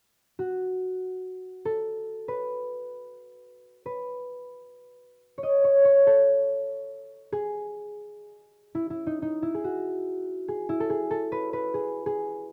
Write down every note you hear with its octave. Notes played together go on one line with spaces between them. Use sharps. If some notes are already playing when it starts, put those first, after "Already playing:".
F#4
A4
B4
B4
C#5
D#5
C#5
C#5
A4
G#4
E4
E4
D#4
D#4
E4
G#4
F#4
G#4
E4
A4
G#4
A4
B4
B4
G#4
G#4